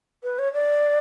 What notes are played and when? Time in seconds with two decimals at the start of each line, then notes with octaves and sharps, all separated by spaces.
0.23 B4
0.39 C#5
0.54 D5